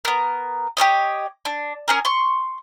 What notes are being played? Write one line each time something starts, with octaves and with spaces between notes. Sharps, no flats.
B3 A#4
G4 A#4 C#5 D#5
D4
C#4 G#4 A#4
C6 C#6